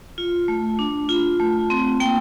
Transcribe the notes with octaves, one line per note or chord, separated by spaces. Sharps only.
F4
A3
D4
F4
A3
C4
A#3 G5